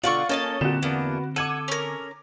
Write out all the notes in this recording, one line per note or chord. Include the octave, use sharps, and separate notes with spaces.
B2 D3 F4 D5 F#5 C#6
A#3 C#4 A4 D#5 A5
A#2 D3 G3 C4 F#4 E7
E2 A#3 B3 D4
A4 F#5 D6 G#6 D#7
C#4 A#4